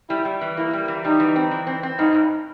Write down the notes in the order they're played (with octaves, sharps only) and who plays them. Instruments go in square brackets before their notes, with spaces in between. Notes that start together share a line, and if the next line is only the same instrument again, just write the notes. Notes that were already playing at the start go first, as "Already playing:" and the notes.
[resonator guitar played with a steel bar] G3 [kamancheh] E4
[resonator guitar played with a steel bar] G3
E3
[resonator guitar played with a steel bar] A#3 [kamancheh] E4
[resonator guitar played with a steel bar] G3
E3
[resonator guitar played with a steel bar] G3 [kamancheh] D#4
[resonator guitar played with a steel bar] E3
C4
E3
C4
C4
[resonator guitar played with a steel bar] G2 [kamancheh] D#4
[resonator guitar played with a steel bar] G2